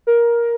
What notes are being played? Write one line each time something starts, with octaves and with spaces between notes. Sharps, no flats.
A#4